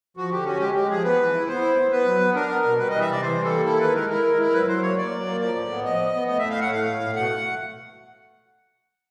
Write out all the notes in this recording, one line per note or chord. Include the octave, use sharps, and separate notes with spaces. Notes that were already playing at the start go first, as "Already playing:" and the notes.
F3 F#4
D3 G4
C#4 F#4
G#3 G4
G#3 G4
F3 G#4
B3 B4
E3
E4
B3 C5
E4
B3
B3 B4
F#3
B3
D4 A#4
B3
B2
G3 B4
E3 D#5
E5
C3 D5
E3 C5
G3
A4
A#3
E4 A4
D#3 B4
G#3 A#4
E4 A#4
G#3
E4 A#4
F#3 B4
F#3 C5
A#3 C#5
A#3 D5
F#3
A#3
F3 D5
A2
B3
F3 D#5
B3
B3
A3 D#5
A2 E5
F5
A3 F#5
A2 F5
A3
A3
B2 F#5